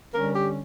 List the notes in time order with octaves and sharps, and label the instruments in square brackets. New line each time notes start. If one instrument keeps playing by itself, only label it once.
[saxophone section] D3 G3 C#4 A#4
G4